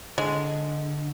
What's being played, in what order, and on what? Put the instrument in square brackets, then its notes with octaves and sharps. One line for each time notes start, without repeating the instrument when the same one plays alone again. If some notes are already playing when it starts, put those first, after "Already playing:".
[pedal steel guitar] D3 [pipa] G#3